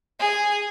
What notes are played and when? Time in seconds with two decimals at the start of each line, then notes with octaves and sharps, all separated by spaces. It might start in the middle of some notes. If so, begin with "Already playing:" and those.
0.20 G#4